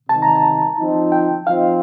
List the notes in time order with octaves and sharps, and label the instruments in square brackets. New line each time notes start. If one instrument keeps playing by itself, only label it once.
[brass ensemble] C3 D#3 G3 [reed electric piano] A5
[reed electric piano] A#5
A5
[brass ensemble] F3 C4 D#4
[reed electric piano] G5
[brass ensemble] F3 C4 D#4 [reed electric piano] F5